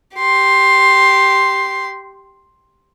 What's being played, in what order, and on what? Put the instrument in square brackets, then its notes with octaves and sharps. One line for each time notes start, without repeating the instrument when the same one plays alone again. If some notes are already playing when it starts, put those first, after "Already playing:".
[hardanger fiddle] G4 C6